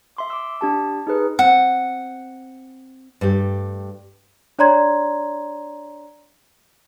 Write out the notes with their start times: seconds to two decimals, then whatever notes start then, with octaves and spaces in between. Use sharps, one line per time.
0.17 E5 C6 D6
0.30 D6 E6
0.61 D4 G4 A5
1.07 D#4 G#4 B4
1.39 C4 F#5
3.21 G2 A3 G4
4.59 D4 C#5 D5 A#5 C6 G#6